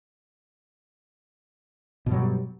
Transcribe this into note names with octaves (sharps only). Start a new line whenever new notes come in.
G2 B2 F#3 G3